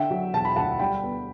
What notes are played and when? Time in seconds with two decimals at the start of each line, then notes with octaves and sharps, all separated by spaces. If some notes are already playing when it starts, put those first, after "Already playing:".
Already playing: D3 E5 G5
0.10 F#3
0.34 E1 A5
0.45 B5
0.56 D2 F#5 A5
0.79 G3 G5 B5
1.03 B3